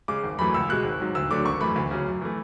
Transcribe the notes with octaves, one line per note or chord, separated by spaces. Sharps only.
C#3 G#3 D6
G#1
F#2 E3 A3 B5
C#2 E6
B2 G#3 F#6
G#1
G#2 F#3
D2 E6
D3 F#3 A3 D6
G#1 C#6
F#2 E3 A3 B5
D2
C#3 F#3
F#2
E3 A3